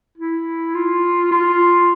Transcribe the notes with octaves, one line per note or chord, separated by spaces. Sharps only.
E4
F4
F4